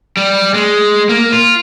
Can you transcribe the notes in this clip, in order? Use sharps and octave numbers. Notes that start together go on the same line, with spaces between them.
G3
G#3
A#3
F4